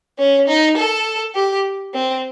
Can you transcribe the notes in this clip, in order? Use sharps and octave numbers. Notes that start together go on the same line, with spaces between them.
C#4
D#4
A4
G4
C4